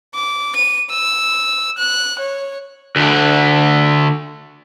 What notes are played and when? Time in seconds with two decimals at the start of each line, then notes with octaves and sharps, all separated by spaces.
0.15 D6
0.56 D#7
0.90 E6
1.78 F#6
2.20 C#5
2.96 D2 D3